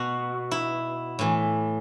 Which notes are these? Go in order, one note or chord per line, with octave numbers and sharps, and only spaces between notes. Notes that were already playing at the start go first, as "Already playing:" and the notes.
Already playing: B2 F#4
E4
A2 E3